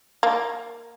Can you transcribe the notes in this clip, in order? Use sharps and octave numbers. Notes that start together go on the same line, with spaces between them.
A#3